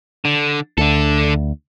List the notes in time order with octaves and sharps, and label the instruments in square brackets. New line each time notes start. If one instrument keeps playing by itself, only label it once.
[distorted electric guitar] D3
[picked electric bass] D2 [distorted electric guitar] D3 A4